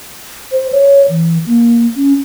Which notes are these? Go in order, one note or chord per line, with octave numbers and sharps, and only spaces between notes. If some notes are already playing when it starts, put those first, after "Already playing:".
C5
C#5
E3
A#3
C#4